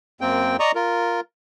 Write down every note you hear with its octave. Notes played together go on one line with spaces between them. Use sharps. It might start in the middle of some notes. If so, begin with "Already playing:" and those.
F#2 A#3 C4 G5
D5 D#5 A#5 C#6 D#6
F4 A#4